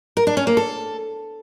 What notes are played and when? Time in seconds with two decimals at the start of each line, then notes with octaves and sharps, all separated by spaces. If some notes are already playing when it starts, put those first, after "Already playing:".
0.17 A#4
0.27 D4
0.37 C#4
0.47 A#3
0.57 A4